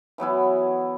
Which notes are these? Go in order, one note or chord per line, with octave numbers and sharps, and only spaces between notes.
E3 F#3 B3 E4